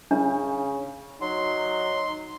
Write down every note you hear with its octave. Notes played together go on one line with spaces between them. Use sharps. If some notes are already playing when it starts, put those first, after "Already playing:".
C#3 D4
F#3 D#4 C6